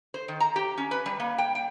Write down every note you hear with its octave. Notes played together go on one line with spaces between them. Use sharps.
C5
D#3
A#5
G4
C#4
B4
G3
A#3
G5
G5